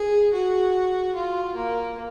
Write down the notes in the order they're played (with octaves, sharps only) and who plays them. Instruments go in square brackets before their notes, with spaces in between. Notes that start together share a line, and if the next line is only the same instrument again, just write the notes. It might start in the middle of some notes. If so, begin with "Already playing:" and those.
Already playing: [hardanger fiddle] G#4
F#4
F4
A#3